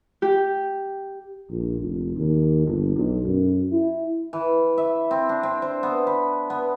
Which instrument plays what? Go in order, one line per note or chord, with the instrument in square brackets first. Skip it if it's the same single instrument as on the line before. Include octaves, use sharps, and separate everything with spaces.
[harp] G4
[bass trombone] A#1
F1
D#2
G1
B1
F#2
E4
[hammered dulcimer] E3
E5
C4
D4
C4
C5
B3
B5
B3